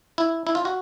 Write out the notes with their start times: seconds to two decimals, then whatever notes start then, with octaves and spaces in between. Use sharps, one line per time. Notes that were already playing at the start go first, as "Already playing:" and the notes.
0.18 E4
0.47 E4
0.55 F4
0.65 F#4